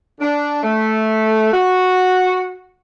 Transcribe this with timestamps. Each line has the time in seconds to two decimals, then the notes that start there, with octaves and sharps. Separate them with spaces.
0.20 D4
0.63 A3
1.52 F#4